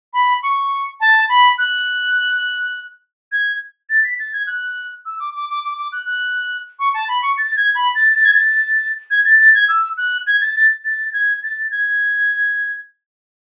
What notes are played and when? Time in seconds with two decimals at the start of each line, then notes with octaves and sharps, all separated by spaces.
0.14 B5
0.43 C#6
1.01 A5
1.29 B5
1.58 F#6
3.32 G#6
3.90 A6
4.04 B6
4.19 A6
4.33 G#6
4.47 F#6
5.06 E6
5.20 D6
5.35 D6
5.49 D6
5.64 D6
5.78 D6
5.92 F#6
6.06 F#6
6.79 C#6
6.94 A5
7.08 B5
7.22 C#6
7.38 A6
7.57 G#6
7.75 B5
7.95 A6
8.15 A6
8.25 G#6
8.34 A6
9.11 G#6
9.25 A6
9.40 A6
9.55 G#6
9.69 E6
9.97 F#6
10.27 G#6
10.41 A6
10.56 A6
10.85 A6
11.13 G#6
11.43 A6
11.71 G#6